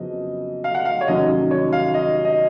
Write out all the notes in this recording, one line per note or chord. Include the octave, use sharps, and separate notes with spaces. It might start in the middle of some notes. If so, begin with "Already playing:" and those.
Already playing: F2 C#3 F#3 B3 D#5
F5
F#5
F5
C#5
F1 D#2 D#3 F#3 C#4 D#5
C#5
F5
D#5
D#5